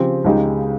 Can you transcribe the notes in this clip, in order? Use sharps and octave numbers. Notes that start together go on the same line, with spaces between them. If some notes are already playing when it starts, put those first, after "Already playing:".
Already playing: C#3 F3 C4 G4
C#2 C#3 G#3 D#4 G4